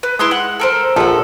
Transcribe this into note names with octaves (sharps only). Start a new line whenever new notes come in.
B4
G#3 E4 C6 D#6
F#5
A4 A#4 C5
A#1 F3 A4 B4 F#5